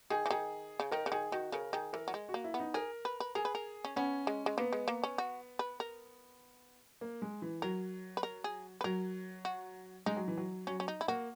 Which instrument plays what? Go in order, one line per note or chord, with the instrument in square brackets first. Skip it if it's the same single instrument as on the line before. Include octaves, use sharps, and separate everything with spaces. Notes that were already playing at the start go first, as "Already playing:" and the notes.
[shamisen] D#3 [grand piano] G#4
[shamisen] E3
[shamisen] D#3 [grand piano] G#4
[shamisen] C#3
[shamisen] D#3 [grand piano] A#4
[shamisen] C#3
[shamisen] D#3 [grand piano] G#4
[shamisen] D#3 [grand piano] F#4
[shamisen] C#3 [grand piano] A#4
[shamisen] D#3 [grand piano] G#4
[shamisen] E3 [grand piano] A#4
[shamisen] F#3
G#3
[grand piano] F#4
[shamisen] A#3
[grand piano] E4
[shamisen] B3
[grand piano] D#4
[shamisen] G#4 [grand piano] A#4
[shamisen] B4
B4
[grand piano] G#4 [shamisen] A#4
[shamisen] B4
A#4
C#4
[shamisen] B3 [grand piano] C#4
[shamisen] G#3
G#3
[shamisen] A#3 [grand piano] B3
[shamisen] G#3
A#3
C#4
F#4
B4
A#4
[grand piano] A#3
G#3
E3
[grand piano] F#3 [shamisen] A#4
[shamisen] B4
A#4
G#4
B4
[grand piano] F#3 [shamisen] A#4
[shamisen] F#4
[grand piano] G#3 [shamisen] D#4
[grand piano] F#3
E3
F#3
[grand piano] F#3 [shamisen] C#4
[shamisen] C#4
D#4
E4
[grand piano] A#3 [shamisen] F#4